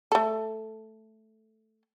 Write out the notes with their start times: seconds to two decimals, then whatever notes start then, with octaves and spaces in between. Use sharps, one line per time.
0.12 A3 A4